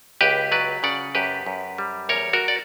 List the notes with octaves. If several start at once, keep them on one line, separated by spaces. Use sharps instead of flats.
C#2 G4 B4
F#3 B4 D5
C#3 D5 F#5
F#2 G4 B4
F#2
G3
E2 A#4 C#5
F#4 A#4
D5